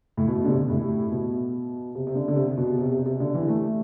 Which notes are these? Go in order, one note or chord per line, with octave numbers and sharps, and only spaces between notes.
A2
B2
D3
C3
A2
B2
C3
C3
D3
D3
C3
B2
C3
C3
C3
D3
E3
A3